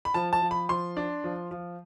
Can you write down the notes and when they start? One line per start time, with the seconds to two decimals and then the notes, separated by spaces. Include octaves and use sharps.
0.05 B5
0.14 F3 A5
0.33 A5
0.42 F3
0.51 B5
0.69 F3 C6
0.97 D4
1.24 F3
1.51 F3